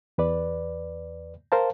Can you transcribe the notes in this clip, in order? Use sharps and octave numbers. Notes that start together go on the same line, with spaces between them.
E2 B4 D5
A#4 C5 F5 A5